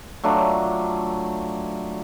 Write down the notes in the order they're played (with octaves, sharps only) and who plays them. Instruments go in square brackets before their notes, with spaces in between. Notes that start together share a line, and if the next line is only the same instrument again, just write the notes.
[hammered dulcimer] F#3 A3 D4 F4